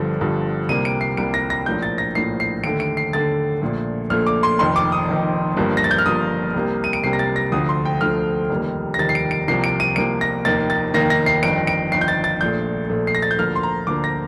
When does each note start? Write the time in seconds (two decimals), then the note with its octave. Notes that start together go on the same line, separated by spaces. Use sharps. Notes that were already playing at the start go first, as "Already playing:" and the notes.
Already playing: G1 G2 D3 F3
0.20 G1 G2 D3 F3
0.69 C2 C3 G3 A#3 D#7
0.85 D7
1.01 C7
1.17 C2 C3 G3 A#3 D7
1.34 A#6
1.50 A#6
1.66 A#1 A2 F3 A#3 G6
1.82 A6
1.98 A#6
2.15 A#1 A2 F3 A#3 C7
2.40 C7
2.63 D#2 D3 A3 D7
2.80 D7
2.97 C7
3.13 D#2 D3 A3 A6
3.61 A#1 A#2 A3
4.10 A#1 A#2 A3 F6
4.27 D6
4.43 C6
4.59 F1 F2 D#3 C6
4.76 D6
4.92 D#6
5.08 F1 F2 D#3
5.56 G1 G2 F3 A#3
5.77 A#6
5.84 A6
5.91 G6
5.98 F6
6.06 G1 G2 F3 A#3 D#6
6.54 C2 C3 G3 A#3
6.84 D#7
6.93 D7
7.04 C2 C3 G3 A#3 C7
7.13 A#6
7.19 A6
7.36 A#6
7.52 D2 D3 F3 A3 D#6
7.69 C6
7.85 G5
8.01 D2 D3 F3 A3 F6
8.49 F1 D#2 D#3 G3 A#3
8.94 A#6
8.98 F1 D#2 D#3 G3 A#3 A6
9.09 C7
9.15 D7
9.31 D7
9.48 C2 C3 F3 A#3 C7
9.64 D7
9.80 D#7
9.96 C2 C3 F3 A#3 D7
10.21 A#6
10.45 F1 D#2 D#3 A#3 A6
10.70 A6
10.94 F1 D#2 D#3 A#3 A#6
11.10 A#6
11.26 C7
11.42 G1 F2 D#3 D7
11.67 D7
11.92 G1 F2 D#3 C7
12.01 G6
12.08 A6
12.24 A6
12.41 A#1 A#2 A3 G6
12.90 A#1 A#2 A3
13.07 C7
13.15 A#6
13.22 A6
13.31 G6
13.39 D2 D3 F3 A#3 F6
13.56 C6
13.63 A#5
13.87 D2 D3 F3 A#3 D6
14.04 A#6